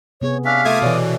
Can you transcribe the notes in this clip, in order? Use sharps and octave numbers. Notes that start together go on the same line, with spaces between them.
C3 B3 G#4 C#5
C#4 D4 E5 F5
A3 F4 A4 E5 D6 D#6 G#6
B2 E3 C#5 D5 E5